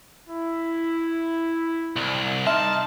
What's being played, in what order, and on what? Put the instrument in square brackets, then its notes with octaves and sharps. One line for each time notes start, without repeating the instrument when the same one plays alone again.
[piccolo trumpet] E4
[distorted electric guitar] C2
[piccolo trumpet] D#4 [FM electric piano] E5 C6 F6 [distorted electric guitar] A5